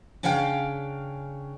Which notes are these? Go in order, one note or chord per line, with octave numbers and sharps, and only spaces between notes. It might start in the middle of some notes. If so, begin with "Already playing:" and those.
C#3 C#4 D4 F5 G5